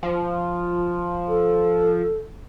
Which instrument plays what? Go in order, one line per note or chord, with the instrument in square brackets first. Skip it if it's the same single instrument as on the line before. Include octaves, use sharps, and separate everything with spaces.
[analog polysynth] F3
[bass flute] A4